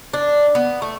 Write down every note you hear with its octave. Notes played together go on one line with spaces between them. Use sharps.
D4
B3
A3